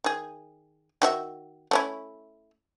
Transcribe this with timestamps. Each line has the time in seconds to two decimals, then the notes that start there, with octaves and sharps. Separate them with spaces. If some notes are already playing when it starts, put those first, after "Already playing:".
0.04 D#3 G#4
1.02 D#3 F#4 E5
1.71 A3 C#4 E4